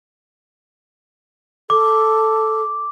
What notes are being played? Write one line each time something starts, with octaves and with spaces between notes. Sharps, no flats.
A4 D6